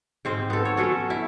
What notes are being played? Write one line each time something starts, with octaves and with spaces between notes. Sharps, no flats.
G#2 C4 C5
B3 A4
C#5
F#3 C#4 F#4 A4
E4